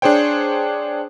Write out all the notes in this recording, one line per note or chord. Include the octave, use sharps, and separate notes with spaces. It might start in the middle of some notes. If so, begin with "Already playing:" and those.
D4 G#4 C5 C#5 G5